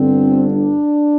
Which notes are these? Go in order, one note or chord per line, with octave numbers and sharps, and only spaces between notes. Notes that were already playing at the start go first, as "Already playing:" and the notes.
Already playing: G1 G2 D3 C4
D4